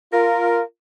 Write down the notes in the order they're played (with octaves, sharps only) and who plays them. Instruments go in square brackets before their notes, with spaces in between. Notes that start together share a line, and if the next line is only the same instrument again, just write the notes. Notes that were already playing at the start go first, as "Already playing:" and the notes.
[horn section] F4 A#4